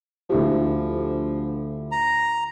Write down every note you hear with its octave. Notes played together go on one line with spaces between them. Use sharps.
D2 F3 E4 G4
A#5